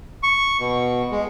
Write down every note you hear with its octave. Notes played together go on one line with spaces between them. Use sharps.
C#6
B2
G#3